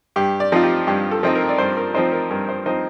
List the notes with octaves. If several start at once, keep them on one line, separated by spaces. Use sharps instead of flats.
G2 G4
D5
F3 C4 D#4 F4
G4
G2 G4
A4
F3 C4 D#4
A#4
D5
G2 C5
A#4
F3 C4 D#4 C5
A#4
G2 A#4
C5
F3 C4 D#4 C5